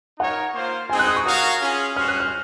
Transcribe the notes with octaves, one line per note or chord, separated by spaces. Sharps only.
D#4 A#4 C#5 F#5
A#3 F4 C5
C4 D#4 G#4 G#5
F#6
D#6
C#6
F#4 A#4 C#5 F5 D#6
C#4 F4 G#4
C#4 F#4 C5 F6
F#6
F6